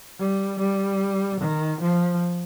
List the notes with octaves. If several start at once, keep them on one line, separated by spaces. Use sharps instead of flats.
G3
G3
D#3
F3